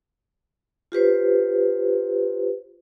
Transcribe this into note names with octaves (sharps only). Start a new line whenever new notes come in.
F4 G4 B4 C5